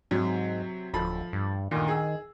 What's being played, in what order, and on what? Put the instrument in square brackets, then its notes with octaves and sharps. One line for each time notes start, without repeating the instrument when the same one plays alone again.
[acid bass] G#2 [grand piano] C3 F#3
[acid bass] D1 [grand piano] F3 A4 B5
[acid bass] G2
[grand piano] D2 A#2 [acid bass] D#3
[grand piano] G#4 E6